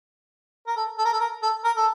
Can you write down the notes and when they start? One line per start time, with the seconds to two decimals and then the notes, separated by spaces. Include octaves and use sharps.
0.67 A#4
0.76 A4
0.98 A4
1.05 A#4
1.13 A4
1.20 A#4
1.42 A4
1.64 A#4
1.77 A4